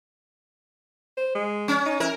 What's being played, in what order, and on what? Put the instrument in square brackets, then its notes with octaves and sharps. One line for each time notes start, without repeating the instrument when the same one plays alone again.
[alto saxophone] C5
G#3
[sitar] C#4
[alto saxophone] D#4
[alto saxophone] E4 [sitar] A#4